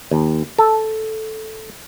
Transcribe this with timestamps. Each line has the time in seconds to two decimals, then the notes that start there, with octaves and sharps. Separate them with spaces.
0.11 D#2
0.58 A4